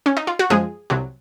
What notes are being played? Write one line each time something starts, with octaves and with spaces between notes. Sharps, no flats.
C#4
D#4
F4
F#4
F#2 F3 G#3 G#4
C2 C3 F#3